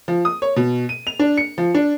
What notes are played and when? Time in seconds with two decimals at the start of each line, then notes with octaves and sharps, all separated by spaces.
0.08 F3
0.25 D#6
0.42 C#5
0.56 B2
0.89 D#7
1.07 F7
1.19 D4
1.38 C#7
1.58 F3
1.75 D4